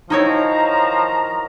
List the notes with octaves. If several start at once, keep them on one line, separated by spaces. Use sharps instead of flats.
D#3 F3 F#3 D#4 E4 C#5 A#5